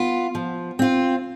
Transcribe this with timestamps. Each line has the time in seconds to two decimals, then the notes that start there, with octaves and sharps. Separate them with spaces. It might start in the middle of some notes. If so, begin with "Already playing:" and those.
Already playing: B3 F4
0.35 F3
0.79 C4 F4